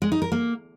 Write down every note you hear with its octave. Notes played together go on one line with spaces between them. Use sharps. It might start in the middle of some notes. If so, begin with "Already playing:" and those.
G#3
D#4
A#4
A#3